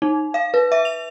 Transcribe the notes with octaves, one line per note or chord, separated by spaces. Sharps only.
D#4
F5
B4
E5
F7